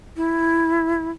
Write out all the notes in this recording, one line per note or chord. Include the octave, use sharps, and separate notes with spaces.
E4